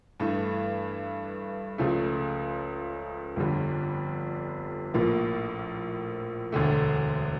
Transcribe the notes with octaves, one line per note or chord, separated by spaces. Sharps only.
G2 E3 A3
C#2 C#3 F3 A3
G1 F2 D3 G3
A#1 A2 F3 A#3
E1 D2 D3 A3